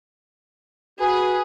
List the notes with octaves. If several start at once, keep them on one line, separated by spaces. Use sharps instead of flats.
F#4 G#4 B4